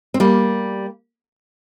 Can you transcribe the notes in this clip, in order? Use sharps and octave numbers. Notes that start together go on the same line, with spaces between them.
C4
G3 A#3